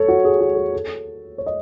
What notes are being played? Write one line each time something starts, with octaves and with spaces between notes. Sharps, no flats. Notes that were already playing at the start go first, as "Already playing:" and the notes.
Already playing: A4 C#5
F#4
G#4
F#4
G#4
A4
C#5
D#5